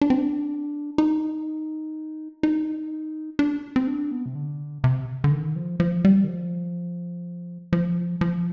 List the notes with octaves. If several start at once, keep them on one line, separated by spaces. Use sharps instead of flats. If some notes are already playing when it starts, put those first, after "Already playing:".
D4
C4
D4
D#4
D#4
D4
C4
D4
B3
C3
D3
C3
D3
D#3
F3
F3
G3
D#3
F3
F3
F3